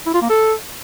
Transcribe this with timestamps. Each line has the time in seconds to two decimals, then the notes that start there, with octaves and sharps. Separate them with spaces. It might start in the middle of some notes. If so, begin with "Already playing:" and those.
0.06 E4
0.14 F4
0.22 A#3
0.30 A4